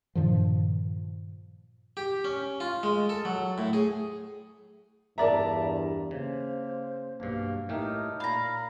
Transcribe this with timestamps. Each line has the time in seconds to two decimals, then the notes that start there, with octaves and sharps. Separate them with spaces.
0.15 G2 A#2 D#3 F3
1.97 G4
2.24 C#4
2.60 F4
2.83 G#3
3.09 A4
3.25 F#3
3.58 A2
3.73 G#4
5.18 E2 G2 A#4 D5 E5 A5 A#5
6.11 C#3 A#3 C5
7.20 B1 G2 A#3
7.69 A2 A3 D#4 G4 A#4
8.20 A#2 F5 A#5 B5